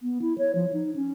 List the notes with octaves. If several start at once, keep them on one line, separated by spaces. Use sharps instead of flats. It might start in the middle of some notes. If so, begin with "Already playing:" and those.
B3
E4
C#5
F3
D#4
C#4